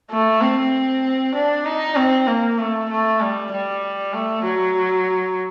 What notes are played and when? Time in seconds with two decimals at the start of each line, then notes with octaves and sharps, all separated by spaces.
0.11 A3
0.41 C4
1.35 D4
1.66 D#4
1.96 C4
2.28 A#3
2.59 A3
2.89 A3
3.21 G3
3.52 G3
4.13 A3
4.44 F#3